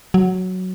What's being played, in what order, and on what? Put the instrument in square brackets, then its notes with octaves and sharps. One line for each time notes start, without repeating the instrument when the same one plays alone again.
[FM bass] F#3